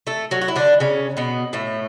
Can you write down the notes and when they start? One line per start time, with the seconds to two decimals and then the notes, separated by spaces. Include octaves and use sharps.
0.07 A3 A4
0.31 F#3 F#4
0.41 F#4
0.48 E4
0.56 D3 D4
0.80 C#3 C#4
1.17 B2 B3
1.53 A2 A3